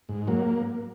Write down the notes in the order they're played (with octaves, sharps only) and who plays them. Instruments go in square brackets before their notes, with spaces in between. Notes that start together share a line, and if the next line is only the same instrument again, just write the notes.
[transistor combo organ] G#2
F#3 A#3